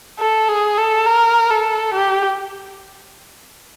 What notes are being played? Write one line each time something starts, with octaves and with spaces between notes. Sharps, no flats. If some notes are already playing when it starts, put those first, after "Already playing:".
A4
G#4
A4
A#4
A4
G4